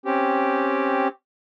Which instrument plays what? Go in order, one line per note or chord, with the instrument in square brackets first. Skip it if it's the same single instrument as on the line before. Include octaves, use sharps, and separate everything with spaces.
[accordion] C4 C#4 G4